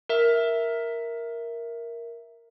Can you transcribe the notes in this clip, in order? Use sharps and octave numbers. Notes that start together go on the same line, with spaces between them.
A#4 E5